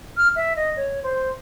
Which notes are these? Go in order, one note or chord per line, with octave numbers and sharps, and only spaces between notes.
F6
E5
D#5
C#5
C5